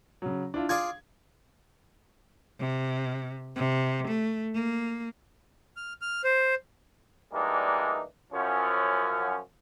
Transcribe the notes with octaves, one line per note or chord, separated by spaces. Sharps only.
C#3 F#3
D4 E4 F4
F4 G#4 D5 G#6
C3
C3
A3
A#3
F6
F6
C5
E3 G3 G#3 A#3 D4 D#4
F#2 F3 C#4